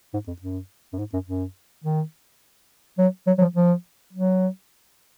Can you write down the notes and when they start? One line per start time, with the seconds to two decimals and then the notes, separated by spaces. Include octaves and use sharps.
0.14 G#2
0.27 F2
0.42 F#2
0.93 F#2
0.99 G#2
1.13 F#2
1.28 F#2
1.84 D#3
2.98 F#3
3.27 F#3
3.38 F#3
3.41 F3
3.56 F3
4.13 F#3